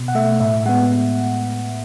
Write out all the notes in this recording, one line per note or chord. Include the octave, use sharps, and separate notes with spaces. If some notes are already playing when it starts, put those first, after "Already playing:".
Already playing: B2
F#5
A3 E5
A2 E5
G#3 B3 F#5